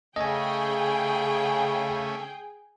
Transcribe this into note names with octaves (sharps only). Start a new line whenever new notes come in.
C#3 A3 C#4 G#4 D#5 G5 G#5